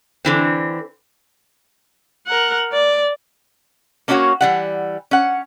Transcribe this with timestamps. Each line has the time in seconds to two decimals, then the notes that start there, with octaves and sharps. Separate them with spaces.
0.25 D3 E3 C4
2.27 A#4 F#5
2.72 D5
4.08 A#3 C#4 D4 F4 F#4 C#5
4.41 E3 G3 F#5
5.11 C#4 F#5